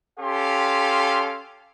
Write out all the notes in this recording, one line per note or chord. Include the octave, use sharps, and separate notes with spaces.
C#4 G4 A4 F5 C6